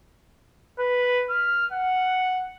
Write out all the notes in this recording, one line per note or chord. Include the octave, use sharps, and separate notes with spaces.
B4
F6
F#5